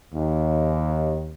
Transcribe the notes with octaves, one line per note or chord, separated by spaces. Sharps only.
D#2